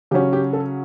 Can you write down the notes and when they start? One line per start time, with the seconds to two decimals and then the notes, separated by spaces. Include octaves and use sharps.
0.11 C#3 F#3 C#4 G4
0.33 G4
0.53 A4